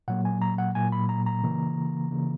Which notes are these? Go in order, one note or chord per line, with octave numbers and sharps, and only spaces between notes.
A#2 F#3 A#3 F#5
G#5
A#5
F#5
A#2 F#3 A#3 G#5
B5
A#5
A#5
C#3 E3 A#3
C#3 E3 A#3